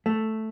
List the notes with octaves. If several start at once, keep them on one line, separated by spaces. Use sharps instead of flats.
A3